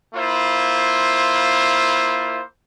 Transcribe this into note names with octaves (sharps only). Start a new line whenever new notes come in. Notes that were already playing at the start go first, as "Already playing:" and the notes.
A#3 E4 F4 C5